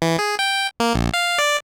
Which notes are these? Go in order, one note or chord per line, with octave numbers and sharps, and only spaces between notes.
E3
G#4
G5
A#3
A#1
F5
D5